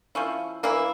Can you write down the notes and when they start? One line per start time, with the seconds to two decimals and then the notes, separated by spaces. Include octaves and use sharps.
0.15 F3 C#4 E4
0.63 E3 A#3 E4